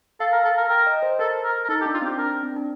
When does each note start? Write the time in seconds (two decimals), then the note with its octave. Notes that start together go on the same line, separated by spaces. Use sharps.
0.20 A4 F5
0.33 A#4
0.45 A4
0.58 A#4
0.70 A#4 G5
0.87 D#5
1.03 C5
1.19 A4 A#4
1.44 A#4
1.64 A#4
1.69 D#4 A4
1.81 G4
1.86 D4
1.94 F4
2.02 C4
2.06 G4
2.18 D4 A#4
2.43 C4
2.56 D4